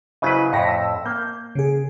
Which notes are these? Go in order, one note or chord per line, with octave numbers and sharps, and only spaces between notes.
C#3 F#3 E4 B4 C5 D#5
F2 A2 C#6 A#6 B6
E6
A#3 G6
C#3 G#4